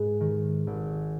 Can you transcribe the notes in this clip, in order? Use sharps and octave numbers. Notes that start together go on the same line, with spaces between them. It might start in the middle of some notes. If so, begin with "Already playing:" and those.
Already playing: G#2 G#3 G#4 B4
D#3
G#1